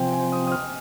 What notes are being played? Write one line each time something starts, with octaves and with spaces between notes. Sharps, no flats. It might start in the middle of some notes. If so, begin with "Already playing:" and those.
Already playing: C3 F3 C4 G5 G#5
G#5
D#6
D#6
F6